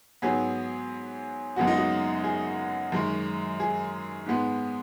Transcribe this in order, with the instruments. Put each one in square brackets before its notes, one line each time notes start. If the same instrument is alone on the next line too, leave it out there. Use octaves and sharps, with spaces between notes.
[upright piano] G#2 F#3 B3 G#4
F#2 C#3 G#3 B3 F#4
D#4
F#4
G#4
F#2 D#3 G#3
G#4
G#2 G#3 B3